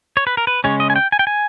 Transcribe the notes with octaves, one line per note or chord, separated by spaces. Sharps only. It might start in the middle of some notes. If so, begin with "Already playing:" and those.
C#5
B4
A#4
B4
C#3 G#3 C#4 C#5
D#5
G#5
G5
G#5
G5
G#5